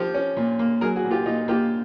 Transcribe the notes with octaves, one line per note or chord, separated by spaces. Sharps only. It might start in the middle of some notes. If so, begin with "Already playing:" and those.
Already playing: F3 G4
C#4
A#2
A#3
F#3 G#4 A#4
F#4 G#4
A#2
F4 G4
A#2 D#4 F4
A#3 F4 G4